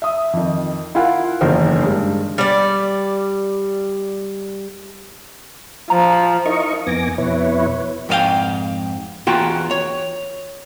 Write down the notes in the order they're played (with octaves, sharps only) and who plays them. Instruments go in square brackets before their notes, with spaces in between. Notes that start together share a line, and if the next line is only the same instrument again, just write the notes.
[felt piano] E5 D#6
F2 D#3
E4 F4 A#4 F5 F#5
F#1 E2 D3 D#3 A#4 C5
G2 G#3
[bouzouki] G3 D5
[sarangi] F3 [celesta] A#5
[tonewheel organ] D#4 E4 A#4 D#5 C#6
F2 B3 G#5 D6 A#6
F2 B2 E4 B4 C#5
[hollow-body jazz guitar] F2 G#2 C#4 F5 G5
E2 F4 F#4 G5 A#5
C#5